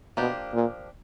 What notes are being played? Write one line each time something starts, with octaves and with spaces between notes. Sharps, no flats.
B2 F3 A#3 D4 G4
A#2